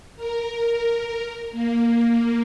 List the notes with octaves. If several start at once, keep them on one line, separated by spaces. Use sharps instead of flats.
A#4
A#3